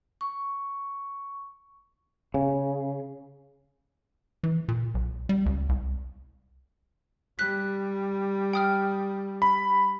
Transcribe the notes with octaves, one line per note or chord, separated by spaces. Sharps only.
C#6
C#3
E3
A#2
B1
G3
C#2
C2
G3 F#6 B6
G5 D#6 F6
B5